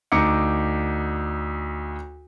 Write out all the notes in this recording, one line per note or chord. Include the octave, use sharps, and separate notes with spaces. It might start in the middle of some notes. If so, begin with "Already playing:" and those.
D2 D#4 A#5 D6 C#7